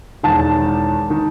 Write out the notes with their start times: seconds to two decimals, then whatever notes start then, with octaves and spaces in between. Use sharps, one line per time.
0.23 E1 E2 D#3 A5
1.10 D#3